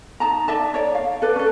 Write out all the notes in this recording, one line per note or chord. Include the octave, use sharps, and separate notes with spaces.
D#4 A5 A#5
D#4 D5 E5 A5
C#5 D5
F5
A4 B4 D5
C#4 A4